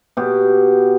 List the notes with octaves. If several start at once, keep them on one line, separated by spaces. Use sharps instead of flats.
B2 G4